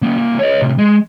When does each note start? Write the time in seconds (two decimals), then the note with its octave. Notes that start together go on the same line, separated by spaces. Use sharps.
0.03 A#3 C#4
0.17 C2 A#3
0.39 C#5 D#5
0.62 A2 C3
0.78 G#3